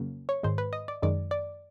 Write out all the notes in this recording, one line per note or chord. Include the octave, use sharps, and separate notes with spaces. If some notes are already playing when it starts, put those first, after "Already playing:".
Already playing: F2 C#3 F#3 A#3
C#5
G#2 D#3 G#3 C5
B4
D#5
D5
F#2 D#3 G#3 D5
D5